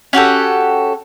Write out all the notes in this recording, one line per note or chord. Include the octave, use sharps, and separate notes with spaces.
C#4 F#4 G4 A4